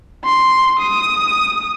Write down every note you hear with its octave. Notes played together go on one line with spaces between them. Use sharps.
C6
D#6